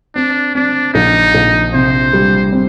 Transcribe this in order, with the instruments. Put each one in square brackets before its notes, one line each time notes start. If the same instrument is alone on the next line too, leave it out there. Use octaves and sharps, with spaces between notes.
[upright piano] C4 [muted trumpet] D4
[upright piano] C4 [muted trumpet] D4
[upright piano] A#1 [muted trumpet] D#4
[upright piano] A#1
[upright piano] C3 [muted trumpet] C5
[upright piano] G3
C4